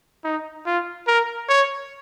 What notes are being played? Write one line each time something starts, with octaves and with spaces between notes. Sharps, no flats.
D#4
F4
A#4
C#5